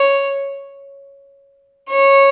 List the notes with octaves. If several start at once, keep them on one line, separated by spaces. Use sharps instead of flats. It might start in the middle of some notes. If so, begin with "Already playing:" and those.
Already playing: C#5
C#5